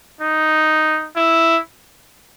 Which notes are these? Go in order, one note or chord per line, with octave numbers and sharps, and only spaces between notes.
D#4
E4